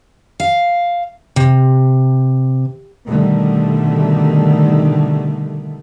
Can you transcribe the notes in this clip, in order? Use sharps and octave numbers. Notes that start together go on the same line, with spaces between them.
F5
C3
B2 D3 D#3 G3 A3